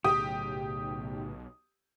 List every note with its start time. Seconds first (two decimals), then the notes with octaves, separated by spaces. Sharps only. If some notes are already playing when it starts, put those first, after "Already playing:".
0.04 B1 A2 C#3 G4 G#4 D#6